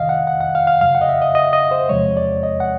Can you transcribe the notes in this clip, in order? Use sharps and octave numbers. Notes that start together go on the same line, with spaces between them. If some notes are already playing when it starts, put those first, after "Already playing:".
Already playing: C#2 C3 D#3 D#5 F5
F#5
F#5
F#5
F5
F5
F#2 C#3 F#3 F5
F#5
D#5
E5
D#5
D#5
D#5
C5
E2 C3 F3 G#3 C#5
D5
D#5
F#5